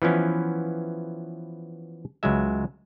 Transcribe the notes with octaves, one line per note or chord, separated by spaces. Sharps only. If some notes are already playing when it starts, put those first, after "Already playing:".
E3 F3 B3 C#4 E4
C#2 F#3 G#3 E5